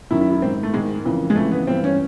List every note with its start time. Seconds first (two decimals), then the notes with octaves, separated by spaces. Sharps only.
0.11 F#2 D#3 E4
0.21 E4
0.31 E4
0.42 G#2 C4
0.45 D#3
0.63 A3
0.74 G#2 D#3 G#3
1.05 F2 C#3 E3
1.30 G#3
1.36 F2 C#3 E3 A3
1.51 B3
1.67 G2 E3 C4
1.84 C#4